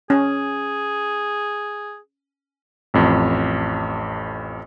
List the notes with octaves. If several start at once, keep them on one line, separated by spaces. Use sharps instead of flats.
C#4 G#4
A1 F2